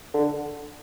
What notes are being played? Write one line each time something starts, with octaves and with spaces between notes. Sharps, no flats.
D3